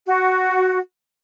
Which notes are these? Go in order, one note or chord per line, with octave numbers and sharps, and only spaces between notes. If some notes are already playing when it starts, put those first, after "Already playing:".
F#4